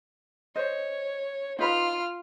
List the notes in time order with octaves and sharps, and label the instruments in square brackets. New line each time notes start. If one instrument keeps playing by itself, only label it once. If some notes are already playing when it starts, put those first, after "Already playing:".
[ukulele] C5 D#5 [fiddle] C#5
[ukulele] D#4 B4 B5 [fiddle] F4 F6